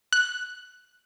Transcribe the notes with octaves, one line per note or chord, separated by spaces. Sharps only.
F#6